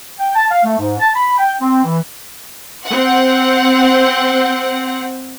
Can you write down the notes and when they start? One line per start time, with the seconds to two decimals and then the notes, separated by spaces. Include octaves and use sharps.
0.19 G5
0.35 A5
0.51 F5
0.64 A3
0.78 G#2
1.00 A5
1.15 B5
1.38 G5
1.60 C4
1.84 E3
2.86 C4 F#5